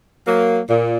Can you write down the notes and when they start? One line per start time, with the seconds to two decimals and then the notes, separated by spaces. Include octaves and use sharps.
0.25 F#3 A#3
0.68 A#2